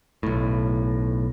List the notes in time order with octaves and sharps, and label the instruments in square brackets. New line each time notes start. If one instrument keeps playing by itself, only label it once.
[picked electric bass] B1 A2